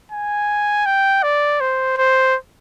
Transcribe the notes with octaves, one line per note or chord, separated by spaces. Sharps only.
G#5
G5
D5
C5
C5